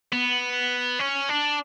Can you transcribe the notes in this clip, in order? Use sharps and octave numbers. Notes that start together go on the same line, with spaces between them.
B3
C#4
D4